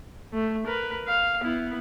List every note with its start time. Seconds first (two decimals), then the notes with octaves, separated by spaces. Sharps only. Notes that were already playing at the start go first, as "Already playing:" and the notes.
0.33 A3
0.66 A#4 B4
1.07 F5
1.41 B3 E4